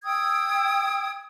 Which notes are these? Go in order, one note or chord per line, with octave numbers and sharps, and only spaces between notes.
G5 D#6 E6 G#6